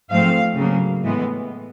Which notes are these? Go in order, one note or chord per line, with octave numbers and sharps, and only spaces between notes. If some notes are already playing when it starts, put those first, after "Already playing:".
G#2 F3 A3 C4 F5
C#3 F#3 A#3
A2 E3 G#3 B3